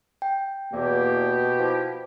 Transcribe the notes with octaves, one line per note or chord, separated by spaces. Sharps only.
G5
E2 B2 A#3 G4
F3 E4